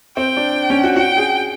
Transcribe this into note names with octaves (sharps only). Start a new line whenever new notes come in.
C4 G5
D4
C#4
F#4
F#4 G5
G#4